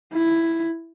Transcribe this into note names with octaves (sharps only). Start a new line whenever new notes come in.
E4